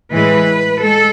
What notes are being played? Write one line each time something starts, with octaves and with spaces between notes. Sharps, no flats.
A2 E3 G#3 B4
G#3 A4